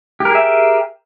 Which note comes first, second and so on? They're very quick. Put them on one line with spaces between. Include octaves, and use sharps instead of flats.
G4 A#4 G#4 E5 G5